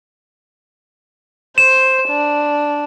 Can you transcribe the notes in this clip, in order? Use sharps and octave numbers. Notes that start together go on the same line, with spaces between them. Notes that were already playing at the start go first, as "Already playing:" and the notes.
C5 E7
D4